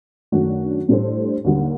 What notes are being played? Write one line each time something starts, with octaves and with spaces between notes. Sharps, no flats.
F#2 D#3 A3 D4 F#4
A2 G3 D4 A4 C5
D#2 D3 G3 A#3